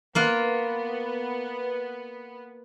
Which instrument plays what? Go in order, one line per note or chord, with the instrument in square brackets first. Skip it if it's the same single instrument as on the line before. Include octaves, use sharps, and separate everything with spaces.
[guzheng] A#3 F4 F#5 [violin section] B3